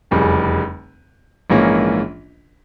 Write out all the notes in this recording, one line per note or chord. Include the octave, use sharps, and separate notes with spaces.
F1 E2 C#3 G3
A#1 G#2 E3 A#3 C#4